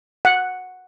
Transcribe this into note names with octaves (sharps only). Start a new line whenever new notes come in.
F#5